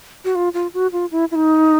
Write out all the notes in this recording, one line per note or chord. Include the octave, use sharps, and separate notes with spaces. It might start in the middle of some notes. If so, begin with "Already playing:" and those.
F#4
F4
F4
F#4
F4
E4
E4
D#4